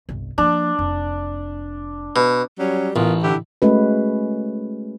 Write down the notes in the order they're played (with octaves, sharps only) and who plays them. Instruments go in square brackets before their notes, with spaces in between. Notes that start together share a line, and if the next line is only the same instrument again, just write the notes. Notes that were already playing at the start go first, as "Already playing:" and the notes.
[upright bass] G1 C2
[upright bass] F3 A#3 [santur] D4
[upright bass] F1
[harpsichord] B2
[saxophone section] F#3 G3 C#4
[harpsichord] A1 [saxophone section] B3 F4 A#4
[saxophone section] D3 E4 G4
[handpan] G#3 A3 C#4 F#4 B4